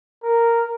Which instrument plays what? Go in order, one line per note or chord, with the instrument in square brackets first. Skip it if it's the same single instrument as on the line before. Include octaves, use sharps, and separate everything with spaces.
[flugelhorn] A#4